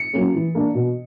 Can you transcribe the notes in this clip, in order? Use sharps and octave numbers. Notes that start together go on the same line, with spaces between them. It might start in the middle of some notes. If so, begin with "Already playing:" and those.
Already playing: C#7
F#3 A#3 C#4
E3
A#3 D4
B2